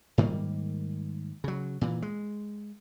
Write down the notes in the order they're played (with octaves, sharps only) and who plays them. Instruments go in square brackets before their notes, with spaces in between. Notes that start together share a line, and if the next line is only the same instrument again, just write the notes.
[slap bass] G#2 D#3 G3 A#3
C#3 F#3
A#2 E3
G#3